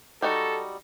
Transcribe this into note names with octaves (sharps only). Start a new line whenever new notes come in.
G3 D#4 F#4 A4